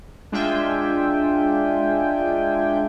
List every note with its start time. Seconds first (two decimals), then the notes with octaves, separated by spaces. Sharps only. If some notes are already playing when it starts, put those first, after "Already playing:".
0.32 G#3 D4 F4 E5 G5 G#5